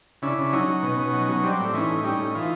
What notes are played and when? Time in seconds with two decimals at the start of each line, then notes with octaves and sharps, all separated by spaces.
0.22 C#3 D4 E4
0.38 C#3
0.53 F#3 C#4 D#4
0.68 F#3
0.83 B2
0.99 B2
1.13 F#3
1.28 F#3
1.43 G3 C4 D4
1.59 A2
1.73 E3 C#4 D#4
1.89 A2
2.04 G3 C#4 D#4
2.19 A2
2.34 E3 D#4 F4